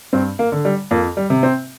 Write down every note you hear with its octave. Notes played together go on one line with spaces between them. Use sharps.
G2 C4
A#3
D3
G3
F2 A#3
G3
C3
C4